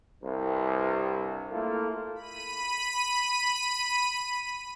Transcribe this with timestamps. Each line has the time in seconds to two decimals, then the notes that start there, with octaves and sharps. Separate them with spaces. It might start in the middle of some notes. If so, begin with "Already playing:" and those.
0.22 C2 G2
1.52 A3 A#3 E4 F4 A4
2.15 B5 D#7